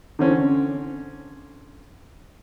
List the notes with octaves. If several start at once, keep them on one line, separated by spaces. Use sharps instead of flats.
D3 C4 C#4